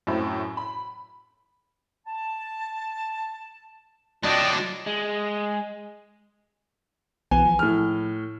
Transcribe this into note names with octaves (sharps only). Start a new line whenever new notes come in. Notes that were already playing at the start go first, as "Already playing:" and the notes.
F#2 A2 C4 E4
B5
A5
F#3 D4 F4 F#4 D5 D#5 G5
G#3
B1 E3 B3 G#5
F3
A2 F6